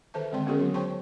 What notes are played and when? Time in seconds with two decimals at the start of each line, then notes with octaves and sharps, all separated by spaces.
0.14 D#3 B4 C5 E5 A5
0.32 D3 G#3 C4 D5 G5 C6
0.46 B3 C#4 F#4 G#4 A#4
0.59 F#3 B3
0.74 C5 C#5 G5 A5 C6 C#6